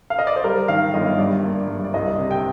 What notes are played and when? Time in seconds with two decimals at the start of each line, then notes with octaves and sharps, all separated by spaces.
0.10 F5
0.19 D#5
0.27 D5
0.36 C5
0.44 G3 A#4
0.68 D#3 F5
0.94 G1 D#5
1.18 G2 D5
1.44 A#3
1.68 G2
1.84 D5
1.93 C2 D#5
2.18 C3
2.31 G5